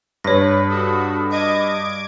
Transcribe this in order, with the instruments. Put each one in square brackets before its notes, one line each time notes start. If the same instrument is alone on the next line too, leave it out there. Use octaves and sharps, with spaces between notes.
[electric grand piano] G2 [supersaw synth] B4 [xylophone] C#5 A#6
[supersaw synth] F#4 A4 [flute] D#6
[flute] D#5 [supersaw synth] D6 G#6 D7